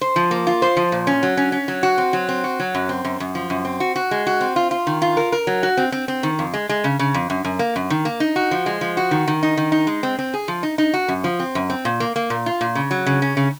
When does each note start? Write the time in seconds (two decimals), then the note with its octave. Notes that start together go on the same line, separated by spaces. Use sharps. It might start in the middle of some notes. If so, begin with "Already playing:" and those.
0.01 C5
0.16 F3
0.31 A#3
0.47 F4
0.62 C5
0.77 F3
0.92 A#2
1.07 C#4
1.23 F#3
1.37 C#4
1.52 C#4
1.68 F#3
1.83 F#4
1.98 C4
2.13 F#3
2.29 C4
2.44 F#4
2.60 F#3
2.75 F#2
2.89 C4
3.05 F#2
3.20 F#2
3.35 F3
3.50 F#2
3.65 C4
3.80 F#4
3.96 F#4
4.11 G#3
4.27 F#4
4.41 C4
4.56 F4
4.71 F4
4.87 D#3
5.02 F4
5.17 A#4
5.32 A#4
5.47 F#3
5.63 F#4
5.77 C4
5.92 C4
6.08 C4
6.23 D#3
6.39 F2
6.54 G#3
6.69 G#3
6.84 C#3
6.99 C#3
7.14 F2
7.30 F#2
7.44 F#2
7.59 A#3
7.76 F#2
7.90 D#3
8.05 A#3
8.20 D#4
8.36 F#4
8.51 F3
8.66 G#3
8.81 F3
8.97 F#4
9.11 D#3
9.27 D#3
9.43 D#4
9.57 D#3
9.72 D#4
9.87 G#3
10.03 C4
10.19 C4
10.34 G#4
10.48 F3
10.63 D#4
10.78 D#4
10.94 F#4
11.08 F#2
11.24 F3
11.40 C4
11.55 F#2
11.70 C4
11.85 A#2
12.00 A#3
12.16 A#3
12.30 A#2
12.46 F4
12.61 A#2
12.75 C#3
12.91 F#3
13.06 C#3
13.22 C#4
13.37 C#3